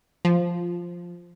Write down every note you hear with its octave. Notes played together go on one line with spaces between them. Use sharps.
F3